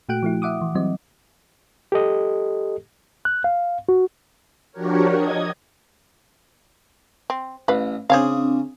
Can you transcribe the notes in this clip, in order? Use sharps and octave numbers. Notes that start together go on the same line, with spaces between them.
A#2 A3 F#4 G5 F#6 D7
F3 A3 E4
E5 F#5 D6 D#6
E3
E3 F#3 G3 C4 D#5
G4 A4 D#5
F#6
F5
F#4
F3 D4 F#4 G4 A#4 C#5
D#5 D#6 G#6
C4
A1 B4 F5
C#3 C4 D4 G#4 C5 C#5 F5